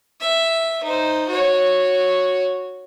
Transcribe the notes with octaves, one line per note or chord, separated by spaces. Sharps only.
E5
D#4 C5
F#4 C#5